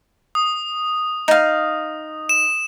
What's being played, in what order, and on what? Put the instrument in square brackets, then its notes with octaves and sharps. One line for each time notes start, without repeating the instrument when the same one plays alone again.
[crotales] D#6
[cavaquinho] D#4 F5
[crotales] E7